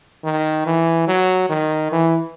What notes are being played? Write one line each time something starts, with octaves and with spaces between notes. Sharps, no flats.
D#3
E3
F#3
D#3
E3